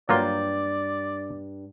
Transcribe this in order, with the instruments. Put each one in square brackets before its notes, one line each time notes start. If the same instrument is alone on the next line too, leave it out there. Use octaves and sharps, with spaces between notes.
[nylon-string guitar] G2 G5 [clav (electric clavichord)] F#3 A#3 F4 [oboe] D5